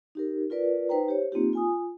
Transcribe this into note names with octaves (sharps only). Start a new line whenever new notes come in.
D#4 G4 A#4
F4 A#4 B4 D5
D#4 B4 C5 G5 A#5
G4 C5 C#5
A#3 C4 D#4 F4 G4
F4 G#5 D#6